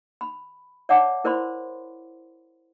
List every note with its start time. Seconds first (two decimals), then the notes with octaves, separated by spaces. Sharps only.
0.21 B5
0.89 C#5 D5 E5 F#5 A5 D6
1.24 E4 A#4 C5 D5 B5 C6